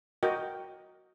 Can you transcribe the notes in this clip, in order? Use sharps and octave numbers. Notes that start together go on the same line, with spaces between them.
F#4 A#4 D#5 G5